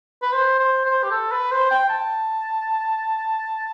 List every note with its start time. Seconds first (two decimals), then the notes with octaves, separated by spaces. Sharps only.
0.22 B4
0.32 C5
0.59 C5
0.86 C5
1.03 G4
1.11 A4
1.32 B4
1.51 C5
1.71 G5
1.90 A5